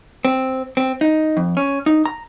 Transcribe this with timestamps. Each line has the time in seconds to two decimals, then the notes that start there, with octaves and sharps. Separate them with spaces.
0.25 C4
0.77 C4
1.01 D#4
1.37 F2
1.57 C#4
1.86 D#4
2.05 A#5